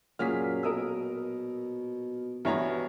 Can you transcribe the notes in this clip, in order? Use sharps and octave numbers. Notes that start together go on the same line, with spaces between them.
F#2 A#2 F#3 G#4 F6 B6
B2 A#4 D#6 E6
G2 B2 E3 B3 C#5 A#5